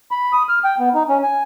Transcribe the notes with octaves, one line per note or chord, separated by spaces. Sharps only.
B5
D#6
F6
G5
B3
D#4
C#4
G#5